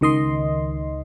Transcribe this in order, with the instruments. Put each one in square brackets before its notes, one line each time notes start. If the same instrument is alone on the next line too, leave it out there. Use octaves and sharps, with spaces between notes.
[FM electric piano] C#2 D#3 D#5 C6